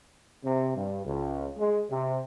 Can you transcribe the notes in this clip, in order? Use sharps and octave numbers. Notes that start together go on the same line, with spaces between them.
C3
G2
C#2
G#3
C3